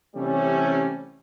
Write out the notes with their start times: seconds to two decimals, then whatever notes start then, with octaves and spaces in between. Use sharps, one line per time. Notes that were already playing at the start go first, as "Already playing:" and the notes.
0.16 C3 E3 G3 A3 C#4